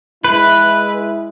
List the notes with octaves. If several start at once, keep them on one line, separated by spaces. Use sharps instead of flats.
G#3 E4 B4